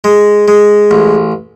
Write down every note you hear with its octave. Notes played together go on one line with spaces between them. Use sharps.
G#3
G#3
A1